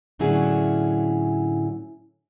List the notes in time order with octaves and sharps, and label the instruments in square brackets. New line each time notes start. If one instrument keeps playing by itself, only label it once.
[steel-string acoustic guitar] A2 D3 F#3 C#4 E4 G#4